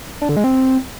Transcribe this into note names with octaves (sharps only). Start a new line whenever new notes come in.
D4
D3
G#3
C4